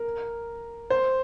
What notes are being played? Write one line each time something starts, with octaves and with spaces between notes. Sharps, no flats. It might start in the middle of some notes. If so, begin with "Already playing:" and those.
Already playing: A#4
C5